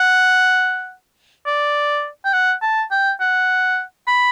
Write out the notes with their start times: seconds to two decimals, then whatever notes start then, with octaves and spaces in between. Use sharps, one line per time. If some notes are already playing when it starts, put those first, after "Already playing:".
Already playing: F#5
1.46 D5
2.25 G5
2.33 F#5
2.62 A5
2.91 G5
3.20 F#5
4.07 B5